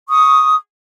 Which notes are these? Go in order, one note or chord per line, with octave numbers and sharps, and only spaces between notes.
C#6 D#6